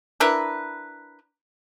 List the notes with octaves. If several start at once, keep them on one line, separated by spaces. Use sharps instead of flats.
D4 E4 A#4 B4